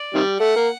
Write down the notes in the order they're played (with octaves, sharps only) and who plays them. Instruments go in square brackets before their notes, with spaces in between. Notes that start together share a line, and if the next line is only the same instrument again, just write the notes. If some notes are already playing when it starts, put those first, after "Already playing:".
Already playing: [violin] D5
[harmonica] C3 D#3 G3
[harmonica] A3 [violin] F#5
[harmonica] A#3